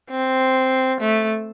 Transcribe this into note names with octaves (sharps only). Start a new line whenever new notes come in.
C4
A3